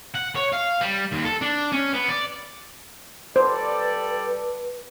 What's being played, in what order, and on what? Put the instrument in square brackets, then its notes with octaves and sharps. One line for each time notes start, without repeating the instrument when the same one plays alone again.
[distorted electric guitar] F#5
C#5
F5
G3
D#2
A4
D4
C#4
B3
D5
[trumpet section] G3 A4 D5 [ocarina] B4 [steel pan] C5